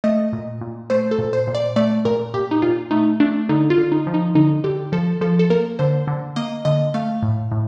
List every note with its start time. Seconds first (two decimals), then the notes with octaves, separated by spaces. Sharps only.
0.04 A3 D#5
0.33 A#2
0.61 A#2
0.90 A3 C5
1.11 A4
1.18 A#2
1.33 C5
1.47 A#2
1.55 D5
1.76 A3 D5
2.05 A#2 A#4
2.34 A#2 G4
2.51 D#4
2.62 A#2 F4
2.91 A3 D#4
3.20 A3 D4
3.49 D3 D#4
3.70 F4
3.78 D3
3.92 D#4
4.07 F3
4.14 D#4
4.35 D3 D#4
4.64 D3 G4
4.92 F3 A4
5.21 F3 A4
5.39 A4
5.50 A#3 A#4
5.79 D3 C5
6.07 D3
6.36 A#3 D#5
6.65 D3 D#5
6.94 A3 F5
7.22 A2
7.52 A2